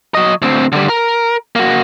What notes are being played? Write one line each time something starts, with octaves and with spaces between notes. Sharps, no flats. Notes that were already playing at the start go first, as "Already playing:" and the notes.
F#3 D#5
D2 C4
D3 G3
A#4
A#3 F#4